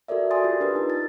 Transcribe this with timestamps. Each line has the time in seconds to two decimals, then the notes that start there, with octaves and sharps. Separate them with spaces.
0.08 F#4 A4 A#4 D5 E5
0.31 D5 G#5 C6 D#6 A6
0.44 F4 G4
0.60 D4 A#4 B4
0.76 D#4
0.90 A6